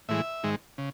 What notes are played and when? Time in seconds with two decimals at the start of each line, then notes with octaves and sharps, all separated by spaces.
0.09 A2 E3 G#3 E5
0.43 G#2 D#3 G#3
0.78 C#3